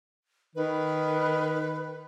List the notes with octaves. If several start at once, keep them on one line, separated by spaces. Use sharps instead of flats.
D#3 B4